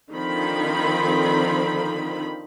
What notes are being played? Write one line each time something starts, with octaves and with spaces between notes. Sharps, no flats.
D3 D#3 F3 C4 D#4 B5